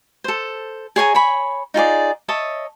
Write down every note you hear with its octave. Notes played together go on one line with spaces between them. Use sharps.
A4 C5
G#4 C#5 G#5 A#5
C#5 G#5 B5
D#4 F4 G#4 D5
C#5 D#5 E5 A5